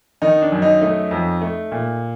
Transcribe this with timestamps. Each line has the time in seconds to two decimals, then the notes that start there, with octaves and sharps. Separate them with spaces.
0.22 D#3 D#4
0.42 D4
0.52 F#2
0.62 D#4
0.82 A3 D#4
1.11 F2
1.41 A3
1.72 A#2